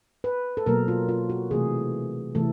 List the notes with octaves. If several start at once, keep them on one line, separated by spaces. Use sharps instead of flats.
B4
A4
B2 F#3 A#3 A#4
F4
F4
F#4
C3 E3 A3 G#4
C3 E3 A3 A4